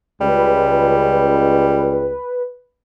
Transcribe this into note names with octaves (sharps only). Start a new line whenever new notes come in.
C#2 G3 B4